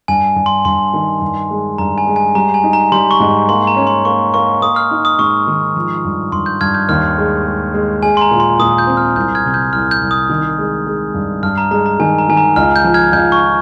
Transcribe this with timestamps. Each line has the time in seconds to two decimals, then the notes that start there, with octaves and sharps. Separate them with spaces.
0.08 G2 G#5
0.36 G2
0.46 C6
0.65 G2 C6
0.94 D#3
1.22 G2
1.51 G#3
1.78 G2 A#5
1.98 G#5
2.07 G#3
2.16 G#5
2.35 G3 A#5
2.54 G#5
2.64 D#4
2.73 A#5
2.92 G3 C6
3.11 C#6
3.20 G#2
3.49 A#3 C6
3.67 A#5
3.77 C#4
3.87 C6
4.05 A#3 C#6
4.34 A#3 C#6
4.62 A#3 D#6
4.76 F6
4.91 D#4
5.05 D#6
5.19 G#2 C#6
5.47 D#3
5.76 F3
6.04 G2
6.32 G2 C6
6.46 G6
6.61 G2 F6 G#6
6.74 G6
6.89 D#2 F6
7.18 G#3
7.46 G#3
7.74 G#3
8.03 G#3 G#5
8.17 C6
8.21 A#5
8.31 A#2
8.40 C6
8.59 A#2 D#6
8.78 G6
8.87 C4
8.97 F6
9.16 C2 G6
9.35 F6 G#6
9.45 C3
9.54 G6
9.73 C2 F6
9.91 G6
10.01 C2
10.11 D#6
10.29 D#3
10.58 G#3
10.87 G#3
11.14 G2
11.43 G2 F6
11.58 A#5
11.71 G#3 A#5
11.86 A#5
11.99 D#3 G#5
12.18 A#5
12.29 D#3 G#5
12.37 A#5
12.56 C#2 F6
12.76 G6
12.84 F3
12.94 F6 G#6
13.13 C#2 G6
13.32 C#6